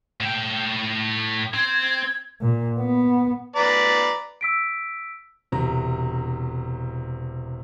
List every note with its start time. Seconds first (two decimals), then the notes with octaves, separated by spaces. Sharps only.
0.21 A2 G5
1.54 C4 G#6
2.42 A#2
2.79 B3
3.56 B4 D5 A#5
4.41 E6 B6 D7
5.52 E1 C3 A#5